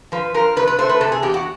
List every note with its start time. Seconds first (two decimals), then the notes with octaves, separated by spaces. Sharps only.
0.12 F3 B4
0.34 F3 A#4
0.56 C3 B4
0.67 B4
0.78 A3 C5
0.89 B4
1.01 C3 A4
1.12 G#4
1.22 E2 G4
1.34 F#4